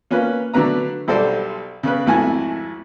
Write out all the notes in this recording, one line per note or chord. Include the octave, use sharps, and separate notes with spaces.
A#3 C#4 F4 B4
D3 F#3 A3 B4 A#5
B1 G3 A4 C5 D5
C#3 B3 B4
G#1 F2 A3 E4 G#5